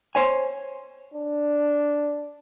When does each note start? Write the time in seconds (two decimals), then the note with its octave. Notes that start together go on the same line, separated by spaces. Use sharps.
0.15 C5 C#5 G#5
1.14 D4